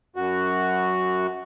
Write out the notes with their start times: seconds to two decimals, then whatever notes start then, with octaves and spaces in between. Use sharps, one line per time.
0.16 F#2 F#4